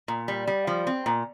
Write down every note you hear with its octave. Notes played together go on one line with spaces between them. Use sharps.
A#2
G3
G3
F3
C4
A#2